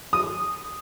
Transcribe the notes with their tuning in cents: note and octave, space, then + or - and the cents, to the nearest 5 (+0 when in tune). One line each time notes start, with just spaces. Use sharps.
D#6 -5